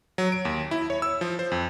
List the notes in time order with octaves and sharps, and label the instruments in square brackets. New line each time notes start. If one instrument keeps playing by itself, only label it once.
[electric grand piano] F#3
D7
D#2
E4
C#5
E6
F3
C5
F2